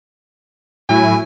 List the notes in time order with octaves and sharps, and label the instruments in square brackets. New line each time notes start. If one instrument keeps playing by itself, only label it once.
[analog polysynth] A2 F#3 E4 [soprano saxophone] G#5